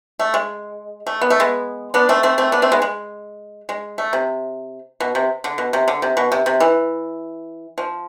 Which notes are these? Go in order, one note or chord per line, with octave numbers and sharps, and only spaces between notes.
A3
G#3
A3
B3
A3
G#3 B3
B3 D4
A3 C4
A3 C4
A3 C4
B3 D4
A3 C4
G#3 B3
G#3
G#3
A3
C3
B2
C3
D3
B2
C3
D3
C3
B2
C3
C3
E3
F3